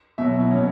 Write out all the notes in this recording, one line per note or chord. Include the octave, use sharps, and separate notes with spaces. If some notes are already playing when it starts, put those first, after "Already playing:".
B2 F#3 E5
E4
B2 F#3 C#4